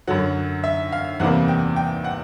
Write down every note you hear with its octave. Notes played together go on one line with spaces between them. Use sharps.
F#2 D3 F#3 F#5
E5
F5
E2 C3 E3 G3 A#3 F#5
G5
G5
F#5